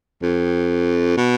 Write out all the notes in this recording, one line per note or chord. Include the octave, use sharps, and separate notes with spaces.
F2
B2